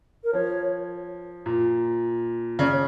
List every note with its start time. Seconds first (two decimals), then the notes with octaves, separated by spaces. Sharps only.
0.24 A#4
0.33 F3 C#5
1.46 A#2
2.59 C#3 D5
2.72 C#5